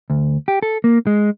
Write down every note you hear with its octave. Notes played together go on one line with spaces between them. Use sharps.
D2
G4
A4
A#3
G#3